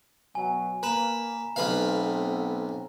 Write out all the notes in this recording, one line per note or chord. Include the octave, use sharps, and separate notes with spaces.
B2 F#3 G#5
A#3 B4 A#5 E7
B1 A3 B3 C4 B4 F5